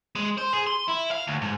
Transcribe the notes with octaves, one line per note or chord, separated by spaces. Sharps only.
G#3
C5
G#4
C6
E4
F5
D2
G#2